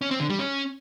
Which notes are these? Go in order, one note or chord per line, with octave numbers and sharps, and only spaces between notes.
C#4
C4
D3
G3
C#4